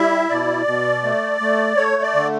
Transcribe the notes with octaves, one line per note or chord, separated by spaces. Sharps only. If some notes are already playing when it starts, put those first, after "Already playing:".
Already playing: G3 E4 E5
B2 D5
B2
A3
A3
A3 C#5
D5
D3